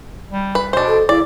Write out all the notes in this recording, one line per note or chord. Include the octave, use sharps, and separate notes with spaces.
G3
B4
B2 D4 C5
A4
C#3 E4 D5